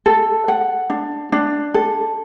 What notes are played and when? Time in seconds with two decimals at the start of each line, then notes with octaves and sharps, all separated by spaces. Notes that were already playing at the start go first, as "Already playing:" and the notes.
0.06 A4
0.48 F#5
0.90 D4
1.32 D4
1.74 A4